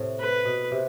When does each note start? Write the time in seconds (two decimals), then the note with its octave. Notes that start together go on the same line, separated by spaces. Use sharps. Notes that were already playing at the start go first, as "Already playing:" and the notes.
Already playing: A2 C3
0.19 B4
0.45 B2
0.71 C3